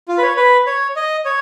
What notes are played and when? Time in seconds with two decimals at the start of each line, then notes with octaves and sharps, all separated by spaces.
0.08 F4
0.18 B4
0.23 C#5
0.37 B4
0.67 C#5
0.96 D#5
1.25 C#5